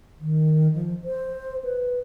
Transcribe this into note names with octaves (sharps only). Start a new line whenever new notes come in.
D#3
F3
C5
B4